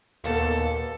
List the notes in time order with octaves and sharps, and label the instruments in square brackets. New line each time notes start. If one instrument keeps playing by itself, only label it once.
[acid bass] D#2 [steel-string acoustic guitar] A#2 A#3 B3 [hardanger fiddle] A4